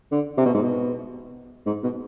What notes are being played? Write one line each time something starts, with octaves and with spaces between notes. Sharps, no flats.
D3
C3
B2
G#2
B2
G#2
B2